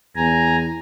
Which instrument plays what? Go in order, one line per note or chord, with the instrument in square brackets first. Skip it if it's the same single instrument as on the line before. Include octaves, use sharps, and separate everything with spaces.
[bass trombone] E2 [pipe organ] G#5 A#5